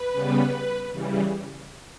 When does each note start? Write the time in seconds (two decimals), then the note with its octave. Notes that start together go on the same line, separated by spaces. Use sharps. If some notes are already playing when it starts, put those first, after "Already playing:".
Already playing: B4
0.12 C#3 G3 B3
0.93 C#3 E3 G3